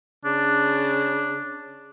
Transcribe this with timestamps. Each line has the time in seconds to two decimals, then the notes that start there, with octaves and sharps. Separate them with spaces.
0.25 C#3 D4